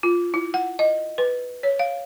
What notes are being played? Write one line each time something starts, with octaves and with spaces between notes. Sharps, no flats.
F4
E4
F#5
D#5
B4
C#5
F5